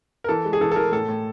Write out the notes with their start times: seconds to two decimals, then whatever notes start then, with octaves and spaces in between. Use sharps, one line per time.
0.24 A#4
0.29 E3 A4
0.45 G#3
0.53 G#4
0.61 E3 A4
0.71 A4
0.76 E3 A#4
0.92 A2 A4
1.08 A2